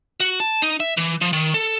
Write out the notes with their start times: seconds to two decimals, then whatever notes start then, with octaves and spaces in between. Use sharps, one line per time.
0.20 F#4
0.40 A5
0.62 D#4
0.80 E5
0.97 E3
1.21 F3
1.33 D#3
1.54 A4